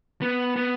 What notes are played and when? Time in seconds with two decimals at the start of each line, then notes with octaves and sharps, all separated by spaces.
0.21 B3
0.56 B3